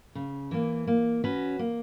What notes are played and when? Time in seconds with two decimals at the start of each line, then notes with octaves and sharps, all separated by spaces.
0.15 C#3
0.51 E3 A#3
0.87 A#3
1.24 C#4 F#4 B4
1.59 A#3